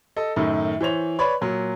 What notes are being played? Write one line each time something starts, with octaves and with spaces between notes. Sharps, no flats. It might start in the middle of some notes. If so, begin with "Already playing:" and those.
A4 D#5
F#2 A2 D#3
E3 C5 C#5 F7
B4 C#5 D5 B5
A#2 F#3